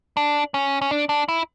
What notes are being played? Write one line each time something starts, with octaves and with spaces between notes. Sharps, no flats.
D4
C#4
C#4
D4
D4
E4